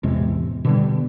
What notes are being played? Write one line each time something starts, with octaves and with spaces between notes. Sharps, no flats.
A1 E2 C3 G#3
B2 D3 G3